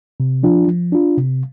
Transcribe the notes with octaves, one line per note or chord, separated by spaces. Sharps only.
C3
F3 D4 F4
F3
D4 F4
C3